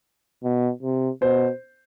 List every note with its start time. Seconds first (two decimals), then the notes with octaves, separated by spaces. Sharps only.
0.44 B2
0.82 C3
1.22 B2 C5